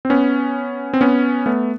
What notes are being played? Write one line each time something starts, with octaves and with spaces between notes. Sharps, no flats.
C4
B3 C#4
C4
B3 C#4
A3 B3